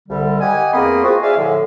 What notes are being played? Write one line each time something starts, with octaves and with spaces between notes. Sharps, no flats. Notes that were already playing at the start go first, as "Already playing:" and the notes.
C2 D3 G3
G4 D#5 F#5 G#5
E2 A#3 C4 B5 C6 D#6
G#3 C4 F4 F#4
G#4 D5 E5 F5 G#5
A2 D3 F3